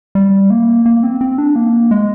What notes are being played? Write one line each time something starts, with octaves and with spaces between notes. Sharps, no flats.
G3
A#3
A#3
C4
C4
D4
A#3
G#3